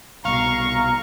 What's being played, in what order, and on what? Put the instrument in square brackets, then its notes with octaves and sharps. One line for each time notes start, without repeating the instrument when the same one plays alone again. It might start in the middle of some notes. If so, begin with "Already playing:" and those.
[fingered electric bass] C2 B2 [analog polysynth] F5 [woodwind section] A#5 [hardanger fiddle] C#6